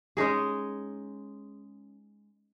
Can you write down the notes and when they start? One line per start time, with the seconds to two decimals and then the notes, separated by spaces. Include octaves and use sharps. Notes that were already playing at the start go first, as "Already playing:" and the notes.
0.17 G#3 C#4 D#4 G#4